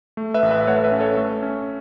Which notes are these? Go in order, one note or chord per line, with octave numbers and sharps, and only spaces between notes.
A3
B4 E5
A1
B4 E5
E5
A3 C#5 F#5
B4 E5
C#4
A4 C#5
A3
C#4